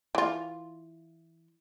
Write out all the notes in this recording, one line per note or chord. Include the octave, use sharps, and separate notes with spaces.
E3 F4